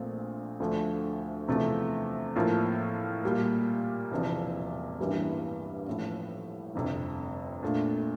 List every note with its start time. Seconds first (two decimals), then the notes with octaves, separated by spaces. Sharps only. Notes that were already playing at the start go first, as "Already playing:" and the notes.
Already playing: A#1 A#2 A3 C4
0.60 D2 D3 F3 A3 D4
1.48 E2 C3 F3 A3
2.36 A2 F3 A#3 F4
3.23 A#2 G3 A#3
4.11 E1 E2 C3 F3
4.98 A1 G2 E3 G3 A#3
5.87 A1 A2 F3
6.75 G1 F2 C3
7.63 A#2 A3 D4